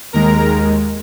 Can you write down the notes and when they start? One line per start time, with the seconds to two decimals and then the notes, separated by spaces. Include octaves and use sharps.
0.13 D#2 D#3 G#3 A#4 A#5